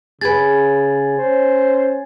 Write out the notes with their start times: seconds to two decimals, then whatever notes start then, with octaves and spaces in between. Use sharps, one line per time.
0.21 C#3 G#4 B4 G#5 G#6 A6
1.18 C#4 C5